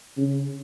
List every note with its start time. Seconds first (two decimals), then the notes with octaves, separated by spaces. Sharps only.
0.18 C#3